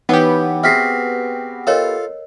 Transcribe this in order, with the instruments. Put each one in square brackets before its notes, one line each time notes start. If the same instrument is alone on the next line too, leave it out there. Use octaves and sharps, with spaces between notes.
[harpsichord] E3 [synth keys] B3 G4 [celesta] D#4 B4 C#5 [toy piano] F#5
[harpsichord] C4 F#4 G#4 [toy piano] E5 [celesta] F6 B6 C7
[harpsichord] F4 A4 F5 [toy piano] A#4 C#5 D#5